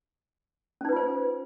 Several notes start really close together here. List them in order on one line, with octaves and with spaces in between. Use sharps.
C#4 D#4 B4 F4 C5